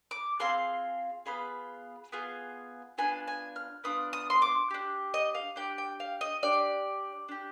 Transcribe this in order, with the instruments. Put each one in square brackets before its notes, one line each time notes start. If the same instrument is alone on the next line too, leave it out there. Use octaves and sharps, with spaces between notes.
[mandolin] D6
C4 F4 G#4 C6
B3 F4 G#4 B5
B3 F4 G#4
B3 D4 F4 G#5
G#5
F6
B3 D4 F4 D#6
D#6
C6
D6
D4 G4
D#5
F5
D4 G4 G5
G5
F5
D#5
D4 G4 D5
D4 G4